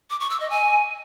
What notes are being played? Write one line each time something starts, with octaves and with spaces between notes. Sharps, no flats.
D6
C#6
E6
D#5
G#5